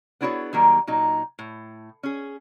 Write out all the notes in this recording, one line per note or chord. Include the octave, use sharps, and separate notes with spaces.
B3 D4 E4 F#4 G#4 C#5
D#3 F#3 G3 A#3
A#2 F#3 D#4
A2
C#4 G#4